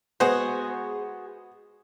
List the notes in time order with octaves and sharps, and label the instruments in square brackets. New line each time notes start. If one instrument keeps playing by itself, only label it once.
[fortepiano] G#3 B3 C5 [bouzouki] F#4 G#4